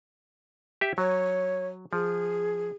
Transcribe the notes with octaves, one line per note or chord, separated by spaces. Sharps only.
G4 E5
F#3 C#5
F3 G#4